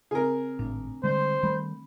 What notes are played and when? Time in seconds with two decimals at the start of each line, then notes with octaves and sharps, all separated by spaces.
0.11 C#3 C4 G#4 A#4
0.59 G#1 A2 D4
1.04 D3 G3 G#3 C5
1.43 D#3 G3 A3 B5